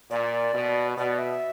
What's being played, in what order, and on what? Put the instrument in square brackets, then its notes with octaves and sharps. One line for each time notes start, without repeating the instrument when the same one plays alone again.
[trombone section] A#2 [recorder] D5
[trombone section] B2
[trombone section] B2 [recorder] D5
[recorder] E5